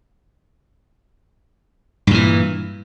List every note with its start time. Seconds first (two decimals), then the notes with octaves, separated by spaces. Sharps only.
2.07 G2
2.11 A#2
2.14 E3